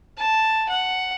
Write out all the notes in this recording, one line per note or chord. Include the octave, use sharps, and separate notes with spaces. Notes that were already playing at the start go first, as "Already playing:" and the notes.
A5
F#5